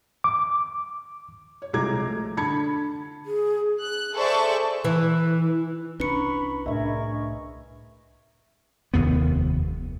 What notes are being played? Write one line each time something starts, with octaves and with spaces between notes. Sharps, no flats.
D6
C#5
C2 F3 G#3 A#5 D6 G#6
A3
D3 A5 B5 G#6 C#7
G#4
F#6
G#4 A4 C5 D5 E5 C#6
E3
C2 C#4 D4 B4 A#5 B5 C#6 C#7
C2 A2 D4 G#4 A#4 D#5 E5 C#6
F1 D#2 B3